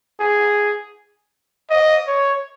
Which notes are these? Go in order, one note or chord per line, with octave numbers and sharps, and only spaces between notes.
G#4
D#5
C#5